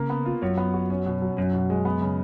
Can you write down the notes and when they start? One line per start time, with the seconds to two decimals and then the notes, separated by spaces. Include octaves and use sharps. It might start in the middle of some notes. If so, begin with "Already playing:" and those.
Already playing: C#3 A#3 A#4
0.10 B3
0.26 F4
0.42 F#2 C#5
0.57 B3
0.74 F#4
0.90 C#4
1.06 B2
1.22 F#3
1.37 F#2 C#4
1.54 B2
1.70 G#3
1.85 B3
2.01 C#3